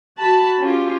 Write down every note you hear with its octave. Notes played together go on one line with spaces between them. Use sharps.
F#4 A5 B5
C#4 F4 G4